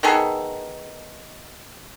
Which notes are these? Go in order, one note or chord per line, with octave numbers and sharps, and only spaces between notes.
D#3 B3 G#4 A4